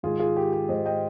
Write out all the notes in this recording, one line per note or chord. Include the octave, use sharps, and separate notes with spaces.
G#2 D#3 F4 G#4
F4 G#4
G4
G4
G#2 D#3 C5 D#5
D#5 G5